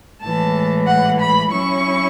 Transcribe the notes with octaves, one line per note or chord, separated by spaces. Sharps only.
A2 E3 G#3 A5
F#5
B5
F#3 C#4 E4 C#6